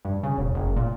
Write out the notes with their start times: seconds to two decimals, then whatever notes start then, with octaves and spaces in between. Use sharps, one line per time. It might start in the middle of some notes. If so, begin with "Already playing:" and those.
0.05 G2
0.23 C#3
0.38 E1
0.55 F#1
0.77 A#2